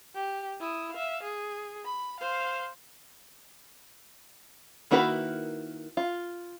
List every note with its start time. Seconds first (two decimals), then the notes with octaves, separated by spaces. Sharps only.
0.15 G4
0.60 E4 D#6
0.92 E5 F5
1.22 G#4
1.85 B5
2.20 C5 F5
4.91 D#3 A#3 E4 F#4 B4
5.97 F4